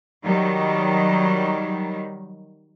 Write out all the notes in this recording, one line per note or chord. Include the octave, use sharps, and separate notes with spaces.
D#3 F#3 G3